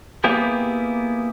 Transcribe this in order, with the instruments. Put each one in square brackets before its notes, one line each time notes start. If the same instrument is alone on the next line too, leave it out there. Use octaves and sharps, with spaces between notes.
[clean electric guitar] A#3 B3 E4 G4 G#4